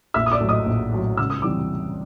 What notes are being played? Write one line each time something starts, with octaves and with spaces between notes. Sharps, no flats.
A#1 E5 E6
D#6
D5 D6
A2 F#3
D#5 D#6
A#1
A2 F#3
C#2 E6
D#6
C3 E3 G3 D6